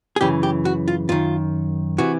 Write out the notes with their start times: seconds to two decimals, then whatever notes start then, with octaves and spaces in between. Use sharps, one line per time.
0.16 G#4
0.21 F#2 C#3 E3 G4
0.43 G4
0.65 F#4
0.88 F4
1.09 F#2 D#3 F4
1.98 C3 E3 F#4